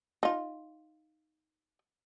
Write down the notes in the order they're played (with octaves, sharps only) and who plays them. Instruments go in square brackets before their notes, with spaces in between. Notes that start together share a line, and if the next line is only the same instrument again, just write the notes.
[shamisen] D#4 F4